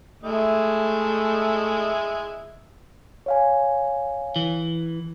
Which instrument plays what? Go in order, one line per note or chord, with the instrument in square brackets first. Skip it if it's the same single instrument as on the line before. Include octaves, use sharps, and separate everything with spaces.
[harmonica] G#3 E4 [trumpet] A3
[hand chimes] C#5 F5 G#5
[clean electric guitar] E3